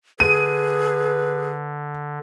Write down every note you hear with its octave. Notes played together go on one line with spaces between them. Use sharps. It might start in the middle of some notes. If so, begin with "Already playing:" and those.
D3 G#4 B4 D#7